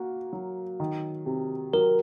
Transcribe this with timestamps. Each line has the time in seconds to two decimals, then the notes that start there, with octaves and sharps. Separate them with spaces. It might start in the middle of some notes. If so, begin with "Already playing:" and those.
Already playing: A#3 F#4
0.33 F#3
0.80 D#3
1.26 C3
1.73 F#3 A#4